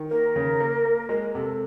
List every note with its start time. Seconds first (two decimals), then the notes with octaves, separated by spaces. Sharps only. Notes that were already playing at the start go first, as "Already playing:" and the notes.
Already playing: D#3
0.10 A#3 A#4
0.36 C#3
0.60 A#3
0.85 A#3
1.09 G#3 A#4
1.35 C3 A4